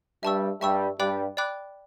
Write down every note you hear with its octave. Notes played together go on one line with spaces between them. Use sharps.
G2 G3 E5 A5 C#6 E6
G2 G3 E5 A5 C#6 E6
G2 G3 D5 G5 B5 D6 F#6
D5 G5 B5 D6 F#6